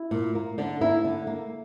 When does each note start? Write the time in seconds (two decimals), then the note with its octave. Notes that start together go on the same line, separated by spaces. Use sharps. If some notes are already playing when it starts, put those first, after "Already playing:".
Already playing: E4
0.11 A#2
0.35 A#3
0.58 D3 D4
0.81 A#3 E4
1.05 D3
1.27 A#3